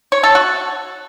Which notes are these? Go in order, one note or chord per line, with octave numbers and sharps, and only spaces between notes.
C#5
A4
F#4